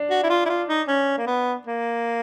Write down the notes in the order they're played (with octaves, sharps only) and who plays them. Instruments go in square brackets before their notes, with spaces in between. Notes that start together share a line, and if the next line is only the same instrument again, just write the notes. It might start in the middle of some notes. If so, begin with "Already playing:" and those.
Already playing: [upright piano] D4
[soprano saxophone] F#4
E4
F4
E4
F4
D#4
C#4
A#3
B3
A#3